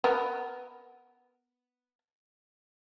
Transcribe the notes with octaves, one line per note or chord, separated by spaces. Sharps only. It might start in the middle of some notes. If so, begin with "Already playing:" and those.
B3 A#4